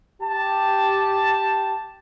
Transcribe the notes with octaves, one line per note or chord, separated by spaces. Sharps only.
G4 A5